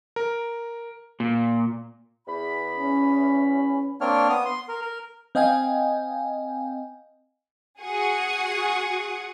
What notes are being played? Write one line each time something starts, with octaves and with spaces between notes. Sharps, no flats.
A#4
A#2
E2 B5
C#4
A#3 C4 D4 C#5 F6
B3 D#6
C6
A#4
A#4
C4 D#5 F5 G5 G#5
F#4 G#4 F#5 C#6 D#6